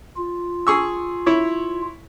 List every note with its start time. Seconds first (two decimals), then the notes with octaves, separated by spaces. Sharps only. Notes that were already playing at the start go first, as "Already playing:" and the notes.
0.17 F4
0.67 G#4 C#6 E6
1.26 E4 C#5